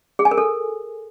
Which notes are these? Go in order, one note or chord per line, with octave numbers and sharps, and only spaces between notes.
G#4
G#5
A#4
A4